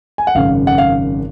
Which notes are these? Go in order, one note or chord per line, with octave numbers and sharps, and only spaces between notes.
G#5
F#5
G#1 F#2 C#3 F5
F#5
F5